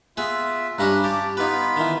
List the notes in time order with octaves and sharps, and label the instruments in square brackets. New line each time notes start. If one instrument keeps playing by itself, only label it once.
[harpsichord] B3 G#4 [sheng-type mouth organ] F4 E5
[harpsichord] G2 C#4 D4 [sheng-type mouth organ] A#5 B5 F#6
[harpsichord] G4 [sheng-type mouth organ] A5 D6
[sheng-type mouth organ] B3 F4 B5 [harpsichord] D#4 B4
[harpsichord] D#3 E3